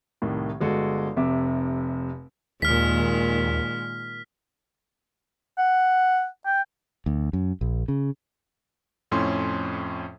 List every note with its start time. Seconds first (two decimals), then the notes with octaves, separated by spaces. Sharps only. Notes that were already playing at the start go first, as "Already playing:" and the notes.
0.22 C2 A2 D#3
0.61 G1 G#3 F#4 A4
1.17 F1 C3 E5 D6
2.62 D#2 A#2 D#3 G#3 F6 B6
5.58 F#5
6.46 G5
7.06 D2
7.33 F#2
7.61 A#1
7.88 C#3
9.11 F2 A2 C#4 C6